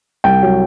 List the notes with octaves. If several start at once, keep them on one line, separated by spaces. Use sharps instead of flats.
C2 G5
F#3